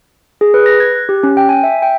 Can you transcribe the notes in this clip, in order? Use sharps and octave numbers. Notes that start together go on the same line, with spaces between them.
G#4
B4
A#6
G#6
F#6
G4
C#4
G5
G#5
E5
G5